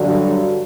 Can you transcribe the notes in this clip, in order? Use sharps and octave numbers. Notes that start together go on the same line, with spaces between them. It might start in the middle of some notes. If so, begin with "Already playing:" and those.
Already playing: G2 D3 F#3